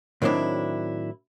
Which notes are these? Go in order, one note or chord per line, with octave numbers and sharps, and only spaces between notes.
A2 D#3 F#3 C4 D4 E4